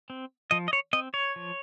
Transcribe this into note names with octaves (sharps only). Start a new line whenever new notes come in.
C4
F3 D#5
D#5
C#5
C4 D#5
C#5
F3